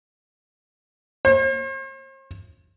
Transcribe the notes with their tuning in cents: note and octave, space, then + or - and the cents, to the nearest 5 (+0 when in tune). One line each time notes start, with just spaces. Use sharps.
C5 +45